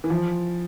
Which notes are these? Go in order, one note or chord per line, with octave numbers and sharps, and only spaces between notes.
E3
F3